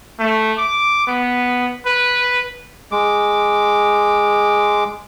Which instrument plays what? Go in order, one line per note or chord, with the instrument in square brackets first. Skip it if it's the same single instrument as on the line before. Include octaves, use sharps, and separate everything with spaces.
[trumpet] A3
D6
B3
B4
[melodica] G#3 D6